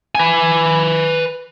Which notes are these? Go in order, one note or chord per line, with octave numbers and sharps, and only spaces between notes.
B4 G#5